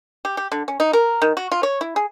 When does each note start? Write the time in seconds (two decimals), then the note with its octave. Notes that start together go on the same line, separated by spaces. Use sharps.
0.25 G4
0.37 G4
0.52 D3
0.68 C#4
0.80 D#4
0.93 A#4
1.22 D#3
1.37 F#4
1.52 F4
1.63 C#5
1.81 E4
1.96 G#4